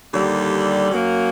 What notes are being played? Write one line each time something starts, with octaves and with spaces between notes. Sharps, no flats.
D#2 D3 G3
F#2 F#3 A#3